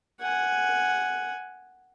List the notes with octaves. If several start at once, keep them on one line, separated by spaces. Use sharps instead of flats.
F#5 G#5